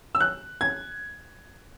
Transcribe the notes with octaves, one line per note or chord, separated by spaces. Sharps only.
E6
F#6
G#6